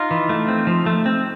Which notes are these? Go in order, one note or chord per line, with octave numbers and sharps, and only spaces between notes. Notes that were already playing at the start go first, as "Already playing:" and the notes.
Already playing: D#4 F4
E3
A3
C4
F3
A3
C4